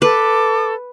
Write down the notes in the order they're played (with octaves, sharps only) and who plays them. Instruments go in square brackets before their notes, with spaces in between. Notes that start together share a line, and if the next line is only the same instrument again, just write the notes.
[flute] A4 [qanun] B4 [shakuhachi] D6